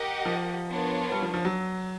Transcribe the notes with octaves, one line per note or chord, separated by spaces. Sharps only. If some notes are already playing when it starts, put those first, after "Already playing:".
Already playing: G4 A#4 D#5 F#5
F3
B3 D4 F4 A#4 C#5
G3
F3
F3
F#3